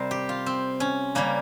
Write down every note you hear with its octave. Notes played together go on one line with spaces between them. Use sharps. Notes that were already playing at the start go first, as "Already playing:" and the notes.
Already playing: C3 G3 A#4 C5
G4
F4
C4
C#4
C#3 G3 A#3